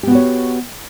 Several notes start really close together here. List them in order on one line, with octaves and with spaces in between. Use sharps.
G4 B3 F#4 C#5